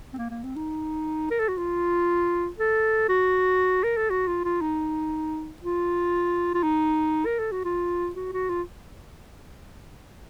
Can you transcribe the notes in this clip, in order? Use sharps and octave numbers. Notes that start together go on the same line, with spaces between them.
C4
A#3
A#3
C4
D#4
A#4
A4
F#4
F4
A4
F#4
A#4
A4
F#4
F4
F4
D#4
F4
F4
D#4
A#4
A4
F#4
F4
F#4
F#4
F4